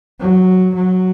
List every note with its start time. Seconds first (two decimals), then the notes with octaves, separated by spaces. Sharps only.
0.20 F#3
0.75 F#3